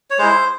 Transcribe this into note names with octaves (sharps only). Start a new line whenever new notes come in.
C#5
G#3 E4 C5